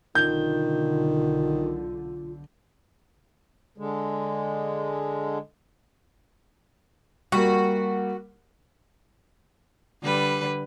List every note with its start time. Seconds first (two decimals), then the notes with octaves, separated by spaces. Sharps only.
0.15 B1 D3 D#3 F4 G6
3.78 D3 G#3
7.32 G3 A#3 F#4
10.02 D3 G3 B4